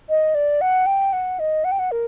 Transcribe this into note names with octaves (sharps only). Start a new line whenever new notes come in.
D#5
D5
F#5
G5
F#5
D#5
F#5
G5
F#5
A#4